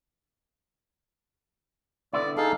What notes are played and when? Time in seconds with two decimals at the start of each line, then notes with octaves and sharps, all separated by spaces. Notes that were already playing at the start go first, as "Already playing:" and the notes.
2.13 D3 B3 E4 D5
2.37 D#4 G#4 A4 F5